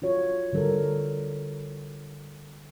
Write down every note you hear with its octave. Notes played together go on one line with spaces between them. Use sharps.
F4 F#4 C#5
D3 G3 A4 A#4